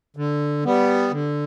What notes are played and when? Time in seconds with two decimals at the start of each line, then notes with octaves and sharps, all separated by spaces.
0.17 D3
0.65 G3 B3
1.12 D3